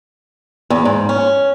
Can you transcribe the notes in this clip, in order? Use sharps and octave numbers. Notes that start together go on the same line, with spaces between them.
E2
G#2
C#4